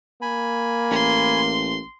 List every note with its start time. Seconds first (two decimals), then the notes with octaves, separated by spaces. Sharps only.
0.22 A#3 G#5 B5
0.91 A1 C6